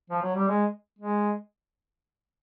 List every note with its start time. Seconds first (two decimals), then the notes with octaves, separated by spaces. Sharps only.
0.10 F3
0.22 F#3
0.35 G3
0.48 G#3
0.99 G#3